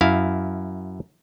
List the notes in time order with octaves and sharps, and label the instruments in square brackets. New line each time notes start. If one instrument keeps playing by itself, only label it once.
[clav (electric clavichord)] F#2 E4 F5